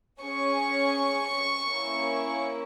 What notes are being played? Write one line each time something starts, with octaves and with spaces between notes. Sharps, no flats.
C#4 G#4 C#6
A#3 C#4 E4